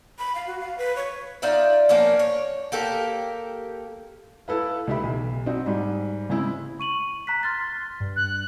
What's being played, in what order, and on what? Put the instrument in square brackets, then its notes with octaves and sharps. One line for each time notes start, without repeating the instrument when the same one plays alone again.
[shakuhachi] B5
F5
F#4
F5
B4
C#5
[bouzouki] D#4 F4 D5 E5
F3 A#3 C#4 D4
C#5
A#3 G4 A4 A#4
[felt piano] E4 A4 B4 F5
C#2 D#4 G4 E5 B5
B1
C4 D4 D#4 F#4
G#2 G3
C#3 G#3 C4 E4
[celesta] C#6 D#7 F#7
A#5 F#6 B6
[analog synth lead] C6 [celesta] F6 A6
[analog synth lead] G2
[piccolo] F#6